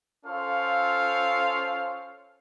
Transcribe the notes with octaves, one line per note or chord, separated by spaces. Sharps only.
C#4 F4 A4 C5 C#5 F5